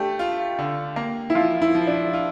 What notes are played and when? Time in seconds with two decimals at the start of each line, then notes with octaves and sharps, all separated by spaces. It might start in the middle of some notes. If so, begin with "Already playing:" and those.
Already playing: A3 D4 G4
0.19 F4
0.59 D3
0.96 A#3
1.30 E4
1.35 F3 F4
1.62 E4
1.75 F3
1.87 D4
2.13 F4